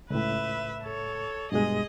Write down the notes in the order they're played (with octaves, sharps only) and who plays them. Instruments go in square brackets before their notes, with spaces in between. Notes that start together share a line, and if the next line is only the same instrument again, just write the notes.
[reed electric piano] C#2 A2 [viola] B4 E5
[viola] A4 C#5
[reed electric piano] G2 B2 G#3 [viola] G#4 D#5